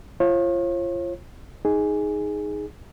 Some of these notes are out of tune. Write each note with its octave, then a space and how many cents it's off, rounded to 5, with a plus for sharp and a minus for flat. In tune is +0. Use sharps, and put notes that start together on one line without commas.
F4 -25 C#5 -45
D#4 +0 G#4 +0